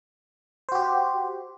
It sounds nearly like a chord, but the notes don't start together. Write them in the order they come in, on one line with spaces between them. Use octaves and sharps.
C5 F#4 G4